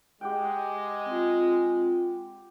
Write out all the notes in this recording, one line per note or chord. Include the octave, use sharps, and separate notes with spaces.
G#3 G4 F#5 G5
C4 F4